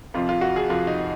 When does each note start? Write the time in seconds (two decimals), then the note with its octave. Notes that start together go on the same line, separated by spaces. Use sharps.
0.14 F2 C3 F3 F4
0.29 F4
0.41 F#4
0.56 G#4
0.69 F2 C3 F3 F4
0.87 D#4